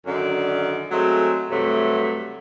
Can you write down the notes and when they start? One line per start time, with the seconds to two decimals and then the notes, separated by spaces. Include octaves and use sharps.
0.06 F#2 D3 D#3 D5
0.91 F#3 G#3 A3 C4
1.50 G2 C3 F#3 A3